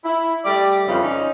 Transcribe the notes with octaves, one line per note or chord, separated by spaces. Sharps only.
E4
G3 A3 D5
F2 C#3 E3 D#4 F4
C#4 D#4